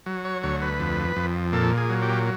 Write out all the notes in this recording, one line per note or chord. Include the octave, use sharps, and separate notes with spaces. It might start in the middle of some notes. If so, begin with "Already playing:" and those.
F#3
C#5
D2 C#5
B4
F2
F2
A#2 A4
G#4
F#3
G4